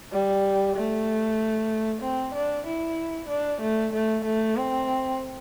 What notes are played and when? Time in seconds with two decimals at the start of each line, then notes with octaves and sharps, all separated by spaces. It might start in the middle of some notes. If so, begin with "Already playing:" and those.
0.12 G3
0.76 A3
2.02 C4
2.34 D4
2.66 E4
3.29 D4
3.61 A3
3.93 A3
4.24 A3
4.56 C4